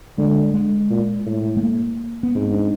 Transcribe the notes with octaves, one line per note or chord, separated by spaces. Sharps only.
D3 G#3
G#3
A#2
A2
A3
A#3
B3
G#2 C4
D4